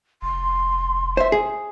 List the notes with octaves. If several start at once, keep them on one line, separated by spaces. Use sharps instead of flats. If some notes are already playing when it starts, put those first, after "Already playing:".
F1 C6
C5 E5
G#4